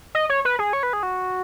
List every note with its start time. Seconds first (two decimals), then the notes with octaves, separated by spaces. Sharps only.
0.15 D#5
0.30 C#5
0.45 B4
0.59 G#4
0.73 C#5
0.83 B4
0.93 G#4
1.03 F#4